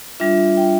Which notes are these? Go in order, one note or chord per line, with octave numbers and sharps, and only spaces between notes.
G3 D4 F4 E5
G5